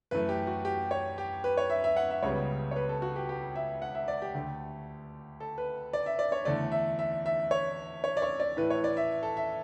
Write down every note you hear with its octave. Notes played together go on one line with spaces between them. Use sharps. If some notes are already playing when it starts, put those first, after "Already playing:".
F#2 E3 A3 B4
G4
F#4
G4
C#5
G4
B4
C#5
E5
E5
F#5
E5
C#2 C#3 G3 B3 C#5
C#5
B4
A4
F#4
G4
G4
E5
F#5
E5
D5
G4
D2 D3 A3
A4
B4
D5
E5
D5
C#5
E2 D3 A3 D5
E5
E5
E5
C#5
C#5
D5
C#5
D5
A2 E3 A3 B4
C#5
D5
E5
A4
E5